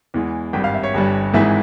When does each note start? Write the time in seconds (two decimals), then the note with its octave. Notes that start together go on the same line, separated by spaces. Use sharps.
0.14 E2 E3 G#3
0.53 G#1 G2 G3 G5
0.64 F5
0.74 E5
0.83 C#5
0.94 G1 G2 G3
1.33 G#1 G#2 E3 G#3 E5